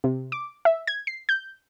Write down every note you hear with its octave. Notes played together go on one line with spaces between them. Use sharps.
C3
D6
E5
G#6
C7
G6